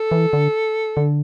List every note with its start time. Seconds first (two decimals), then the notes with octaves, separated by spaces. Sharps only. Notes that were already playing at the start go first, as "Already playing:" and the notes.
Already playing: A4
0.11 E3
0.33 D3
0.97 D3